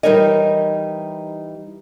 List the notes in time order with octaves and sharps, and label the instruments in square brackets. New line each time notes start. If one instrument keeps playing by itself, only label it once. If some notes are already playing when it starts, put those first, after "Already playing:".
[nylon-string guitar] E3 G3 D#4 A#4 C#5 D#5